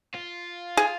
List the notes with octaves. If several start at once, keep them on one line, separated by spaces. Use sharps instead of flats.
F4
G#4